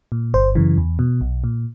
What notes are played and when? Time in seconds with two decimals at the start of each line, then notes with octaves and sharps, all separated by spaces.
0.12 A#2
0.34 G1 C5
0.55 F#2 C#3 E3
0.77 E2
0.99 B2
1.21 B1
1.44 A#2